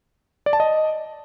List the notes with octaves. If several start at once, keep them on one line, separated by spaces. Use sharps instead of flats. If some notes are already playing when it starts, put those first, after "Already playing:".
D5
A5
D#5